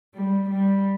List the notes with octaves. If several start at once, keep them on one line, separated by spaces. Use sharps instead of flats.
G3
G3